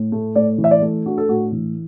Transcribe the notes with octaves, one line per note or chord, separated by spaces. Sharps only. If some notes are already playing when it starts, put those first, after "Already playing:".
Already playing: A2
A3
A2 D5
E3
E5
D5
A3
D4 F#4
A4
A2 F#4
E3